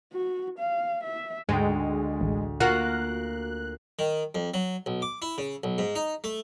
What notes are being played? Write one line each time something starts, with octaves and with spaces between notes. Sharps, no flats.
F#4
F5
E5
D2 G#2 G#3 G5
A1
A#3 F4 F#4 F#6
D#3
F2
F#3
B1
D6
E4
C#3
B1
G#2
D#4
A3